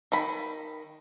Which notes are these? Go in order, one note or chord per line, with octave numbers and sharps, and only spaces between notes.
D#3 B5